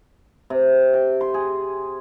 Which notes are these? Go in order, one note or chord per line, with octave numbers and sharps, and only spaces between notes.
C3
G5
C6
G#4